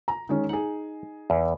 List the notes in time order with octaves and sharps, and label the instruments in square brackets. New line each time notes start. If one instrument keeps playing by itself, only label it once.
[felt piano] A#5
D#3 G#3 C#4
[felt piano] D#4 G#4 [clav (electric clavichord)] F#5
[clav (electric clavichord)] E2